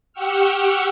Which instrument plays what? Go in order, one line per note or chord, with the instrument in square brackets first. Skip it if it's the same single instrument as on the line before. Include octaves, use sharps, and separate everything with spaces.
[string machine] G4 F#5 G5 C#6 E6 F6